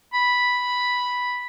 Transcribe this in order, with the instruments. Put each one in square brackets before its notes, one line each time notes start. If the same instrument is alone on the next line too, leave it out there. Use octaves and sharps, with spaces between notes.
[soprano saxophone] B5